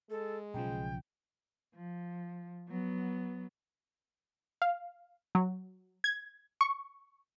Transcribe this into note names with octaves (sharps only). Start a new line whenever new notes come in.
G#3 A4
B1 C#3 F3 G5
F3
F#3 B3
F5
F#3
G#6
C#6